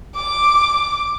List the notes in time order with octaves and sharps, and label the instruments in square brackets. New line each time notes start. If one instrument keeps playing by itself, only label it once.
[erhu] D6